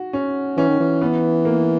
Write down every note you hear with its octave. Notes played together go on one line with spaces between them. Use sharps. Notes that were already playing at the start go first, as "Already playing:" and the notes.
Already playing: F#4
C#4
E3 C#4
D#3
E3
B3
A#3